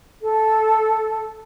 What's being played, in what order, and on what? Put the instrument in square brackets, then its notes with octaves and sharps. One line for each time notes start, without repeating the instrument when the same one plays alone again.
[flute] A4